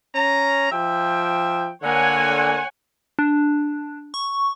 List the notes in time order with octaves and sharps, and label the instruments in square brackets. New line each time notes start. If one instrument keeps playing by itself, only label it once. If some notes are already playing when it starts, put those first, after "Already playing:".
[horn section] C#4 A#5
F3 E5 G5
[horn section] D3 A#3 [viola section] C#5 F#5 G#5
[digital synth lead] D4
C#6